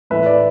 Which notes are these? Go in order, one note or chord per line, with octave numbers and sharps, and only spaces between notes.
A2 E3 A3 B4 E5
D5